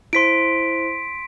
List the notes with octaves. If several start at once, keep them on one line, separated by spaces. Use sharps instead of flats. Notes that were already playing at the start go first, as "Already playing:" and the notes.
E4 C5 C6 B6 D7